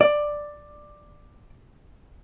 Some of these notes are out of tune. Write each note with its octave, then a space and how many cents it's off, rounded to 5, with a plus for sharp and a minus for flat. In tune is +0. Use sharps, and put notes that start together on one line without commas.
D5 +10